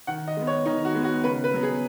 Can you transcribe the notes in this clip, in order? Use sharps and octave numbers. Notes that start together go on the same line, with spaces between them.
D#3 F#5
D#5
G#3 B3
C#5
D#3 D#4
F#4
G#3 B3
F#4
C#3 B4
B4
F#3 B3
G#4